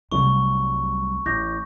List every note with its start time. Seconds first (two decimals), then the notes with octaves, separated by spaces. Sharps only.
0.12 C2 C3 F#3 G3 A3 C#6
1.25 A1 D6 G6 A#6